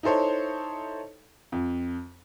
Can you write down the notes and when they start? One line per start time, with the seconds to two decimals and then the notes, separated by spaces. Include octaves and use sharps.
0.03 D#4 E4 A4 C5 C#5
1.52 F2